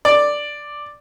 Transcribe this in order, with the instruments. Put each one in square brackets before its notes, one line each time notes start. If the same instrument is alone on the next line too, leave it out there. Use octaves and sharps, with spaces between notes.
[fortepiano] D5